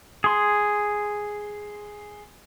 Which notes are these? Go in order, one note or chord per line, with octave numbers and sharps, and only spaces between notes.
G#4 C6